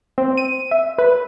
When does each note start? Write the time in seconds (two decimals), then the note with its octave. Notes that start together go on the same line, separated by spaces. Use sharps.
0.18 C4
0.37 D#7
0.71 E5
0.98 B4